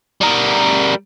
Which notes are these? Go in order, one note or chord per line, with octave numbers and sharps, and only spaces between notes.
G3 A#4